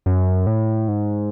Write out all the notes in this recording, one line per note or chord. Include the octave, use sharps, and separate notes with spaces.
F#2
A2
G#2